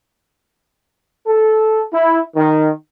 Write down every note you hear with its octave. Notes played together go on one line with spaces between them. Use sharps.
A4
E4
D#3